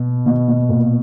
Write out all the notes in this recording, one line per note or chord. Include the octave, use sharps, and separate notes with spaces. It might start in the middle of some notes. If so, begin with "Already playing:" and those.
Already playing: B2
B2
B2
A#2